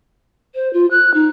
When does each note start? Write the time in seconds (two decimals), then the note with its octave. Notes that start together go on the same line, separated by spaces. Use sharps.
0.55 C5
0.73 F4
0.91 F#6
1.14 D#4